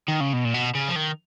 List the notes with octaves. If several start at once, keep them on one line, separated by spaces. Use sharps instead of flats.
D#3
C#3
B2
A#2
B2
C#3
F3
D#3